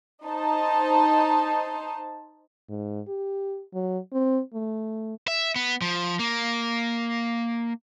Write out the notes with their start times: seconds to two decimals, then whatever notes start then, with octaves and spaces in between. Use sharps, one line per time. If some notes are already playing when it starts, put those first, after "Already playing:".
0.25 D#4 C5 A5
2.69 G#2
3.08 G4
3.74 F#3
4.13 C4
4.54 A3
5.28 E5
5.56 B3
5.82 F3
6.19 A#3